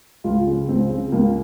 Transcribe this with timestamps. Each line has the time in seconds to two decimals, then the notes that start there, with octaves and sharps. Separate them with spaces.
0.24 C#2 F4
0.46 C#3
0.68 C#2 C4
0.89 C#3
1.12 C#2 A#3